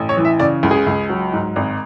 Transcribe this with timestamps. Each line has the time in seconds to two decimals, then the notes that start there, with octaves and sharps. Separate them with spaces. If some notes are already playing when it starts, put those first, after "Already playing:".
Already playing: A1
0.09 C#5
0.17 E3
0.25 E5
0.40 C#3 D5
0.63 C#2
0.71 G#4
0.87 C#2
1.09 F#3
1.33 G#2
1.56 G#1